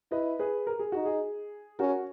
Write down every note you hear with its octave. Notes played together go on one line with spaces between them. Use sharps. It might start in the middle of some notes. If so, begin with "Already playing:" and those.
E4 B4 D#5
G#4 B4
A#4
G#4
D#4 F#4
G#4
C#4 F#4 A#4